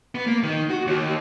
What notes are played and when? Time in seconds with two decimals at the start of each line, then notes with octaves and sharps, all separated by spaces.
0.15 B3
0.27 A#3
0.43 D#3
0.69 F#4
0.87 D#2